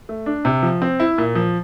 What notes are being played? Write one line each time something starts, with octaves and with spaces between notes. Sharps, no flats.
A3
D4
C3
F3
C4
E4
A#2
F3